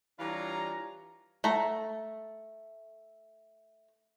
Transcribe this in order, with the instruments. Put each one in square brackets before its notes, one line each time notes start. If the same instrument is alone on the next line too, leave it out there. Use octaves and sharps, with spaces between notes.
[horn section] E3 G3 D4 F4 C#5 A#5
[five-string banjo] A3 A#5